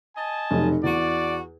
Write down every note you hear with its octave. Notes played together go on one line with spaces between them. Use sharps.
D#5 G#5 A5
F1 B1
E2 F#4 D5